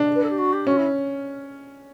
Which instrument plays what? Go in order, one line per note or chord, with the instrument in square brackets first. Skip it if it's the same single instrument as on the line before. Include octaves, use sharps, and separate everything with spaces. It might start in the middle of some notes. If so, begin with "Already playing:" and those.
Already playing: [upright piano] D4
[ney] B4
A4
G4
F#4
G4
[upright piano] C#4 [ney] F#4
[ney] E4